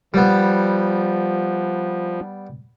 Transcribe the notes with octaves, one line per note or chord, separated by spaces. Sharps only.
F3 G3 B3